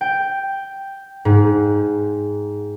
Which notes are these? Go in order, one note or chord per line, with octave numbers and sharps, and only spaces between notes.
G5
G#2